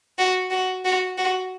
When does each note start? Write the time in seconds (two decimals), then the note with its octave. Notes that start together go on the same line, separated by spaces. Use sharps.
0.19 F#4
0.51 F#4
0.85 F#4
1.18 F#4